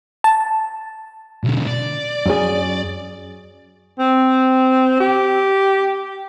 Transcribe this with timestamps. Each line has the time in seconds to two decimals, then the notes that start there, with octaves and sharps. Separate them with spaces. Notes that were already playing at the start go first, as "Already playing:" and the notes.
0.24 A5
1.44 B1 D3
1.67 D5
2.26 F#2 C#4 G#4
3.99 C4
5.00 G4